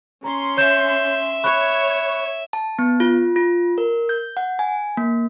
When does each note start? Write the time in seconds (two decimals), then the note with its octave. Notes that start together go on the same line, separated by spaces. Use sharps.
0.24 C#4 A#5 C6
0.57 C#5 E5 G6 E7
1.44 C#5 B5 C#6 F#6
2.53 A5
2.79 B3
3.00 F4
3.36 F4
3.78 A#4
4.09 G6
4.37 F#5
4.59 G#5
4.97 A#3